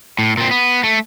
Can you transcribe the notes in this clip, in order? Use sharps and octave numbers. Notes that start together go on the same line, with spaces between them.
A2
A#2 C4
B3
A3